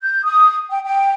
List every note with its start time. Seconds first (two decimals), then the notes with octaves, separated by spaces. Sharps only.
0.02 G6
0.25 D#6
0.70 G5
0.84 G5